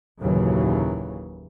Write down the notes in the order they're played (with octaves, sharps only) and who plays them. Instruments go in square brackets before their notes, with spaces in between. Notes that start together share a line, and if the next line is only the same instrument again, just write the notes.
[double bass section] F#1 D#2 A#2 C#3 E3 F#3